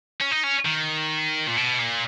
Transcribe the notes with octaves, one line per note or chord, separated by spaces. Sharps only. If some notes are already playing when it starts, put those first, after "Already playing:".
C#4
D#4
C#4
D#3
A#2
B2
A#2